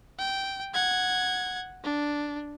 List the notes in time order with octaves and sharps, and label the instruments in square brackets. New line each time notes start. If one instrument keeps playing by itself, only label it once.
[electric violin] G5
F#5 G#6
D4